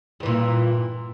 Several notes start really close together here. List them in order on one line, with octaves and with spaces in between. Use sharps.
G2 E3 A#2